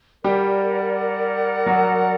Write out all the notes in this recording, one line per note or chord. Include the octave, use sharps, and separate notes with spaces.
G3 G4 A#4 D5 F#5
F#3 F#4